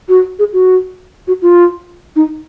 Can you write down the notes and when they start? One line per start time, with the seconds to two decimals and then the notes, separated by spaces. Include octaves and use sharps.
0.09 F#4
0.39 G#4
0.53 F#4
1.28 F#4
1.42 F4
2.16 D#4